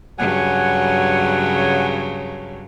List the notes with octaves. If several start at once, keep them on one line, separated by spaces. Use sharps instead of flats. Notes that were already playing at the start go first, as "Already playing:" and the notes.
G2 C#3 F#3 F#5 G#5